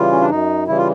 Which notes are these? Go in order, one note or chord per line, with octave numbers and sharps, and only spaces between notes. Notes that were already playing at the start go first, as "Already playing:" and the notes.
Already playing: C#3 E3 G3 F4
C#4
D4
F#2 D#4
C#3 E3 G3 E4
F4